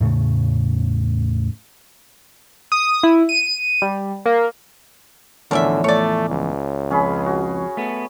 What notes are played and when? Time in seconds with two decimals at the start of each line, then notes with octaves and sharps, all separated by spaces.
0.01 E2 A2 C#3 A3
2.72 D#6
3.03 E4
3.29 D#7
3.82 G3
4.26 A#3
5.51 E2 A2 D3 F3 C#4 A#4 D5 E5
5.84 A3 C#5 D5
6.30 C#2
6.91 F2 C#4 G#4 B5
7.26 F#4
7.77 A3 B3